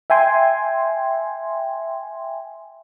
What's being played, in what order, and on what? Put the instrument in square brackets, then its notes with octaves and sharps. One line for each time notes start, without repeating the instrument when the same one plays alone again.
[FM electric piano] E5 G5 G#5 C6